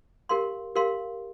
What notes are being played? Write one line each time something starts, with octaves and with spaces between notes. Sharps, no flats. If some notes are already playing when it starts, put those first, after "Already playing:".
G4 A#4 F5 C6
G4 A#4 F5 C6